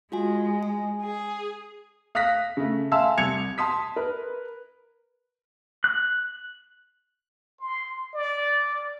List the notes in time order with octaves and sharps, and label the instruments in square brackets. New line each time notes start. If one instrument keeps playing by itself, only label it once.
[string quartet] G#3 [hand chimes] F4 F#4 G#5
[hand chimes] G#5
[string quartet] G#4
[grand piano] F5 D#6 F#6 A#6 B6
C#3 A3
E5 F5 G#5 A5 C6 E6
C2 G#6 C#7 F7
A5 C6 D#6 B6
A#4 B4
[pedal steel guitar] F#6
[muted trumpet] C6
D5